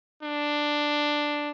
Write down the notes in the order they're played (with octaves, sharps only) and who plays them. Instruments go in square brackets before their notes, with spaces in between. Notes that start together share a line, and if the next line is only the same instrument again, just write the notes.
[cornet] D4